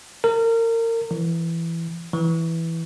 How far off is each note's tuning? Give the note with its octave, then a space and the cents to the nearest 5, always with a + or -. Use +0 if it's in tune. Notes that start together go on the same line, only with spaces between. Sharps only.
A#4 -30
E3 +15
E3 +0